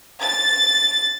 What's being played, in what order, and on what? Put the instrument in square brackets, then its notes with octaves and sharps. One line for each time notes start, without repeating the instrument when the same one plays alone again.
[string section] A6